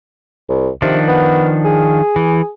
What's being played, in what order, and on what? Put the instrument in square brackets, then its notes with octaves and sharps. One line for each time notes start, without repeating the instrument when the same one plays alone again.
[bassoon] C2
[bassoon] C3 [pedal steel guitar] D#3 F3 D4
[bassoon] B3
G#4
[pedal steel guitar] E3